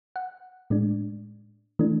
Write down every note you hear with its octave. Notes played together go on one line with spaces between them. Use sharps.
F#5
A2 G#3 D4
E3 A3 D4